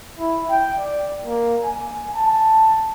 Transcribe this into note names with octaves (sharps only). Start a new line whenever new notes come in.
E4
G5
D5
A#3
G#5
A5